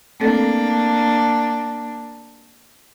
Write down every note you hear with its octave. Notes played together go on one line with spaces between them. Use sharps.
A3 A#3 C4 D4 A4